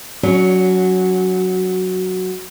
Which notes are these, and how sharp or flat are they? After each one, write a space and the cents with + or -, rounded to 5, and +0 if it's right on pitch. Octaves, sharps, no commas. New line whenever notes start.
F#3 +0 C#4 +20